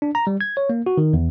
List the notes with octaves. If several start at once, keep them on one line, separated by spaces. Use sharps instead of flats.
D4
A#5
G3
G#6
C#5
A#3
F#4
D#3
E2